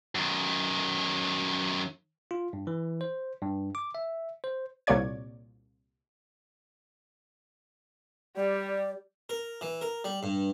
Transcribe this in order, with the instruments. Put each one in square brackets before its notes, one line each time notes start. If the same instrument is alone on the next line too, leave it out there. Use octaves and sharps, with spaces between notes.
[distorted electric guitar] F#2 D#3
[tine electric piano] F4
G2
E3
C5
G2
D6
E5
C5
[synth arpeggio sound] C2 A#2 C#5 D5 G#6
[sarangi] G3 [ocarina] D5
[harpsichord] A#4
E3
A#4
G3
G2